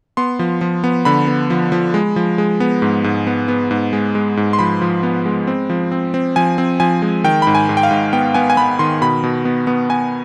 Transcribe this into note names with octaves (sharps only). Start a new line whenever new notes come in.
B3 C6
F3
F3
B3
D3 B5
B3
F3
F3
G#3
F3
G#3
B3
G#2
G#2
B3
B3
G#2
G#3
G#3
G#2
C6
F3 B5
F3
B3
G#3
C4
F3
C4
C4
F3 G#5
C4
F3 G#5
G#3
D#3 G5
G#2 B5
G#5
G#2
G5
F5
G#2
B3 G5
B3 G#5
G#5
B3 B5
D#3 C6
B2 B5
B2
B3
B3
B3 G#5